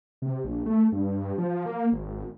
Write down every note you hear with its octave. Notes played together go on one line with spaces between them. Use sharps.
C3
A#1
A3
G2
F3
A#3
G#1